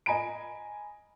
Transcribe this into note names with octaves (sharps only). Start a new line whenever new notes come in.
D#5 G#5 A#5 B5 D7